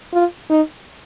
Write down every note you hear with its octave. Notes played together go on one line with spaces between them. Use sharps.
F4
D#4